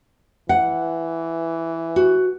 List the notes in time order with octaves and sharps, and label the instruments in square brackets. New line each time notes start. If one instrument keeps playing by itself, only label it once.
[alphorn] E3 [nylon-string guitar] F#5
[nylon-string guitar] F#4